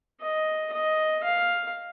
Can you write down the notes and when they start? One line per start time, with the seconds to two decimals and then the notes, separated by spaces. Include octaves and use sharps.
0.21 D#5
0.73 D#5
1.24 F5